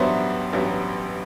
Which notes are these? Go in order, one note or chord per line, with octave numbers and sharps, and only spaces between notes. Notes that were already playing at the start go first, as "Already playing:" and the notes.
Already playing: A1 G2 F#3 B3 C5 E5
A1 G2 F#3 B3